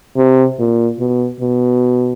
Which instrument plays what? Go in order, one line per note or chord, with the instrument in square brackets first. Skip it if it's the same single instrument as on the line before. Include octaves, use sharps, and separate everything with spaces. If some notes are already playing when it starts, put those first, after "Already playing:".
[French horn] C3
A#2
B2
B2